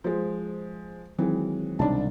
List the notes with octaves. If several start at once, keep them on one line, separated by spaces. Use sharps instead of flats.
F3 G#3 C5
D#3 E3 F#3 G#3 C4
C2 B2 D4 D#4 A5